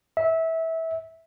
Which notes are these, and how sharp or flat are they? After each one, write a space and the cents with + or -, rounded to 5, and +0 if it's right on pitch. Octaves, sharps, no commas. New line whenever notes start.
E5 -20